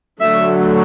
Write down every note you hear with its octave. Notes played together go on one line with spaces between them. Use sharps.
D3 F#3 A3 E5